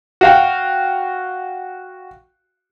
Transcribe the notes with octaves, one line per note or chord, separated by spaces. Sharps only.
F#4 F5 G5